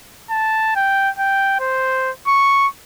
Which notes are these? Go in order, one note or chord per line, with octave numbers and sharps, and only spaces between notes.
A5
G5
G5
C5
C#6